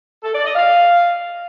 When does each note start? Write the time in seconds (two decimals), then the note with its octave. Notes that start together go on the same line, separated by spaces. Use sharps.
0.24 A4
0.34 D5
0.45 D#5
0.55 F5